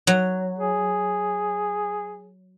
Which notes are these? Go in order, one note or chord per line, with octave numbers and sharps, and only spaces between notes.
F#3
G#4